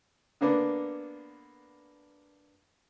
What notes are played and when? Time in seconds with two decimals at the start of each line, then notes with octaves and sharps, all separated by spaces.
0.41 D3 A#3 B3 D4